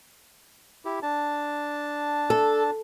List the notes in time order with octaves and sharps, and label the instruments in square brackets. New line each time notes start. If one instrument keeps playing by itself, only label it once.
[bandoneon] E4 G4
D4 A5
[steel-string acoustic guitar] A4